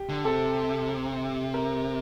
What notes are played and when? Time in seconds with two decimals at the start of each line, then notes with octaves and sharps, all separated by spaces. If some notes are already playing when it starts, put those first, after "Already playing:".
Already playing: G4
0.09 D3
0.24 C3 A4
1.54 A#4